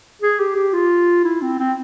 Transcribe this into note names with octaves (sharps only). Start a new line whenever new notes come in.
G#4
G4
G4
F4
E4
C4
C4